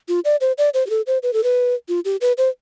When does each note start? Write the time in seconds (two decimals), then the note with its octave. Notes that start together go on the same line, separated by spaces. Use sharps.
0.08 F4
0.25 D5
0.41 C5
0.58 D5
0.74 C5
0.87 G4
0.90 A4
1.07 C5
1.23 B4
1.33 A4
1.43 B4
1.89 F4
2.05 G4
2.21 B4
2.38 C5